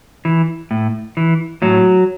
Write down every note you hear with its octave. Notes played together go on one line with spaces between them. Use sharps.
E3
A2
E3
A2 F#3